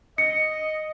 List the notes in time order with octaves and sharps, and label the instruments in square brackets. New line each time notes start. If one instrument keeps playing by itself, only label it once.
[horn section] D#5 [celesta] C#7